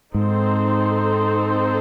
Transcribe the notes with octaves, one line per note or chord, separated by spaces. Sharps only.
G#2 C4 D#4 A4 C5